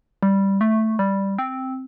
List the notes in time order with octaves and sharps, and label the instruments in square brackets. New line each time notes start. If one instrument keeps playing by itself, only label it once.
[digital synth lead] G3
A3
G3
C4